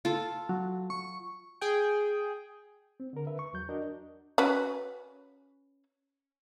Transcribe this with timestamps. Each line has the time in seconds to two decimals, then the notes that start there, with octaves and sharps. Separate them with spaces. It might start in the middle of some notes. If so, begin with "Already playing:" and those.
0.05 F4 A4
0.49 F#3
0.90 C#6
1.61 G#4 G5
3.00 C4
3.13 D3 A#4
3.27 D3 B4 E5
3.39 C#6
3.53 E2 F#3 G6
3.69 D4 F#4 A#4 D#5
4.38 C#4 F#4 B4